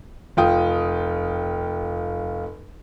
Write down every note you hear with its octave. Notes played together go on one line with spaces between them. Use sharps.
F1 F4 G5 D#6